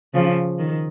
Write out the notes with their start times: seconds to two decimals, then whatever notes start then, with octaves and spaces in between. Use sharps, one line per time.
0.14 C#3 F3
0.59 D#3